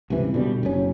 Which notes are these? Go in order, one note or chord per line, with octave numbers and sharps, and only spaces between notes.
C#2 G2 C3 E3
B2 D3 F3 G3
F#1 B1 F#2 C#4